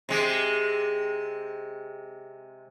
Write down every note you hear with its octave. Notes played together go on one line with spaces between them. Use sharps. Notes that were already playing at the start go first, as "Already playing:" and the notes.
C3 G#3